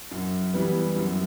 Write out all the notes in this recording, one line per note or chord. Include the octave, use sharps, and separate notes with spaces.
F#2
E3 G3 B3
F#2